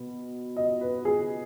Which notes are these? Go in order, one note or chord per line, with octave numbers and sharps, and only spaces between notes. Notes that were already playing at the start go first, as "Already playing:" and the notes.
Already playing: B2 B3
D#5
B4
G#4